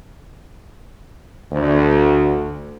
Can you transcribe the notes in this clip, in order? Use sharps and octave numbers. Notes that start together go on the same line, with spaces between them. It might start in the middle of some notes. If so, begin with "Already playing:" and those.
D2